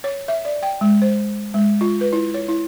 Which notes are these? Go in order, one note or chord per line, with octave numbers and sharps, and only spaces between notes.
C#5
E5
D5
G5
G#3
C5
G#3
F4
B4
E4
C#5
E4